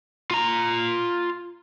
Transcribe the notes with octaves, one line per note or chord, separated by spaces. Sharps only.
F4 A#5